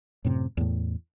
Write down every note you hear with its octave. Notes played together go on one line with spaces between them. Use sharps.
F#2 A2 C3
E2 A2